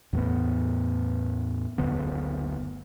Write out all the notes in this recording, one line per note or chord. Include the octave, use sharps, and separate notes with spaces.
E2 A2 B3
F#1 D2 D3 B3